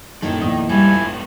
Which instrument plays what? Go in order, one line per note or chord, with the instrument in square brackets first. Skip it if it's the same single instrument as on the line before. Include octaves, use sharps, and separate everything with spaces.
[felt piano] D#1 F#2 [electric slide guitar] D#3 [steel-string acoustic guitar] A#3 E4 A4
[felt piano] A#1 E2 D#6
[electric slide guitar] G#2 B3 A4 [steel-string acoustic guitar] G3 [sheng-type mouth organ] E4 G#5
[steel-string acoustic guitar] F4